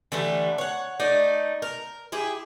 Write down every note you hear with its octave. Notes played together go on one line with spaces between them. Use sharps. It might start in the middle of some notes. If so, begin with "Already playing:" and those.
D3 E3 G3 A3
C#5 F#5
A3 D#4 D5
A#4
E4 G4 G#4